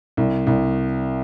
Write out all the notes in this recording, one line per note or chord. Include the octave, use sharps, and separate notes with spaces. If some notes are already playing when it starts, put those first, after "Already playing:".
C2
C2